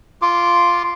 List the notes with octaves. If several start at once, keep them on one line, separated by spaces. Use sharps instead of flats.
F4 C6 D6